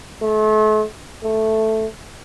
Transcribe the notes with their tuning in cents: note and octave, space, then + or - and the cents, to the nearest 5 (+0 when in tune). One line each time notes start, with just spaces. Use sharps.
A3 -40
A3 +0